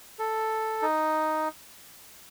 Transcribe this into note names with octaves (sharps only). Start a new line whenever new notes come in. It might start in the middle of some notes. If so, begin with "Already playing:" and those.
A4
D#4